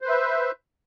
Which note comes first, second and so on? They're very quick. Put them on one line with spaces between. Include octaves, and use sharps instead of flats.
C5 B4 E5